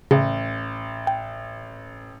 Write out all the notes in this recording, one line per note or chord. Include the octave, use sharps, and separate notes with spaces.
A1 C#3
G5